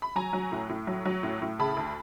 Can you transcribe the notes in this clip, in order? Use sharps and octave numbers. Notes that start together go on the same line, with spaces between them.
B5
F#3 G#5 A#5
F#3
A2
A2
F#3
F#3
A2
A2
C#3 A5 B5
D2